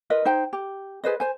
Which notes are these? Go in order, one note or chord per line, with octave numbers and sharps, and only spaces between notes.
F4 A#4 B4 D#5
D#4 C5 G5
G4
G#4 B4 C5 D#5
C5 G#5